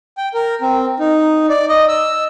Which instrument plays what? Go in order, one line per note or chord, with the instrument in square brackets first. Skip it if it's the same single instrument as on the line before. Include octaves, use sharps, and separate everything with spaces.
[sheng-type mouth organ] G5
A#4
C4
D#4
D5
D#5
E6